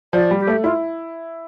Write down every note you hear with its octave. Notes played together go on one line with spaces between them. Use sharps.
F3 D5
G3
G4
A3
E4 F4